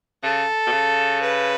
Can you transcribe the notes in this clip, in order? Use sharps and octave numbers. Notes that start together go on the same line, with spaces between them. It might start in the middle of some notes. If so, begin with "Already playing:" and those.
C#3 A4
B2
C#3
B4